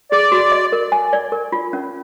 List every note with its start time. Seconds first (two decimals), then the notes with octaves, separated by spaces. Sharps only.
0.12 G#4 D5
0.32 F#4
0.52 D#5
0.72 A#4
0.92 G#5
1.13 D5
1.32 A#4
1.52 F4
1.73 C#4